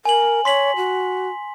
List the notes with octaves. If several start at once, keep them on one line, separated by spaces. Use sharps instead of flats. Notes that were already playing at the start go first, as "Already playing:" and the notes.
A#4 G#5 F#7
C#5 C6 B6 F#7
F#4